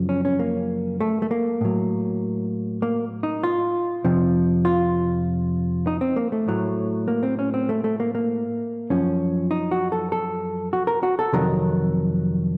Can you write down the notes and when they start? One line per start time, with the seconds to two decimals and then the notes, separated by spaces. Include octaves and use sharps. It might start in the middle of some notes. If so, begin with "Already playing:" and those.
Already playing: F#2 C#3 F3
0.09 C#4
0.25 C#4
0.39 A#3
1.01 A3
1.22 A3
1.31 A#3
1.61 A2 F#3
2.82 A#3
3.23 D#4
3.44 F4
4.05 F2 C3 F3
4.65 F4
5.87 D#4
6.01 C4
6.16 A#3
6.32 A3
6.48 A2 F#3
7.08 A#3
7.23 C4
7.39 C#4
7.54 C4
7.69 A3
7.84 A3
8.00 A#3
8.15 A#3
8.90 F#2 F3 C#4
9.51 D#4
9.71 F#4
9.92 A4
10.12 A4
10.73 F#4
10.87 A#4
11.03 F#4
11.19 A4
11.33 F2 C3 D#3 F#3 A#4